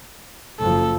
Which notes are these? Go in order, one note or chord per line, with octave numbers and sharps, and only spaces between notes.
F#1 F3 A4